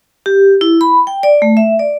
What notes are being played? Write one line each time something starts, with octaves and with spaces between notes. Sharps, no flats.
G4
E4
B5
G5
D5
A3
E5
D5